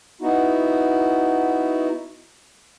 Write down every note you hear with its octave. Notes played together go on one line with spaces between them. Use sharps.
B3 D#4 E4 F#4